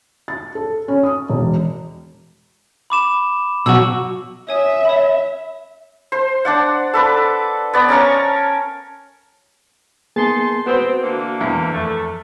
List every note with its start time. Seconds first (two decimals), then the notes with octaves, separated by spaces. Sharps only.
0.28 A6
0.55 A4
0.88 C#4
1.03 D#6
1.30 E1
2.90 B5 D6 E7
3.66 B2 F#3 F#4 E6
4.49 C#5 E5 G#5 D#6
4.85 C#5 B5
6.12 C5
6.45 D4 D5 F#5
6.93 A4 B4 D6
7.73 B3 D5
7.89 C#4 A#4 A5 C#6
10.16 A#3 B3 D#4 G#4 A5 C6
10.66 B3 C4 F#4 C5
11.02 D3 E3 A#3
11.41 E2
11.72 F2 A3